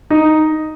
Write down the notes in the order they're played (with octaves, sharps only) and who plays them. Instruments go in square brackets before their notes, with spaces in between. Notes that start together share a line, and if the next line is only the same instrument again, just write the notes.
[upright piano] D#4